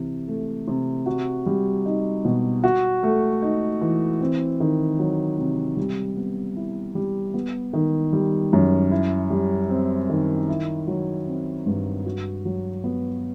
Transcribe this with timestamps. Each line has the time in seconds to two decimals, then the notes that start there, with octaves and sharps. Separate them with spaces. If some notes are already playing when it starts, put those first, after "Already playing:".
Already playing: C3 E3
0.28 A3
0.68 C3
1.06 F#4
1.46 G3
1.86 D#4
2.25 B2
2.64 F#4
3.03 A3
3.42 D#4
3.81 E3
4.21 C4
4.60 D#3
4.99 F#3
5.38 C3
5.77 G3
6.17 B3
6.56 E4
6.95 G3
7.34 B3
7.73 D#3
8.13 G3
8.53 F#2
8.91 E4
9.30 G3
9.69 C4
10.10 D#3
10.49 E4
10.87 F#3
11.26 C4
11.66 G2
12.06 F#4
12.45 F#3
12.84 B3